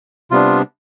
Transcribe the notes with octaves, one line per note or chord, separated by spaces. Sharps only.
C3 G3 B3 D4 F4